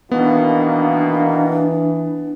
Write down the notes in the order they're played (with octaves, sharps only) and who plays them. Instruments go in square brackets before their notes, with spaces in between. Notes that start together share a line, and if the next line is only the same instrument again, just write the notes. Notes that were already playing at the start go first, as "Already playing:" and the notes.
[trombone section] B2 D#3 A#3 [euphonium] E3 [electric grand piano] B3 [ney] D4